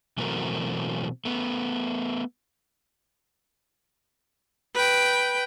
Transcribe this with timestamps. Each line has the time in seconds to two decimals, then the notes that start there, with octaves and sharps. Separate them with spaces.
0.18 B2 E3 F#3 A3 C4 A#4
1.25 A3 B3
4.75 B4 G5